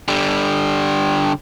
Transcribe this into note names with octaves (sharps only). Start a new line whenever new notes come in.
D3 G3